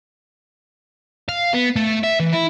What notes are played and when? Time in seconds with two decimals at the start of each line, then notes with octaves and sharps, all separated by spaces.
1.29 F5
1.54 B3
1.76 A3
2.03 E5
2.20 E3
2.33 E4